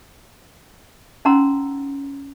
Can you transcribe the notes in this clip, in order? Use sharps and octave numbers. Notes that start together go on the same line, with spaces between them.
C#4 D#4 F#5 A#5 C6 E6